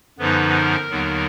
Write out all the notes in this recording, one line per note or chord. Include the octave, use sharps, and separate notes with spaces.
F#2 D3 F3 B3 D#4 B4
A#4
D#2 D3 F#3 B3 D#4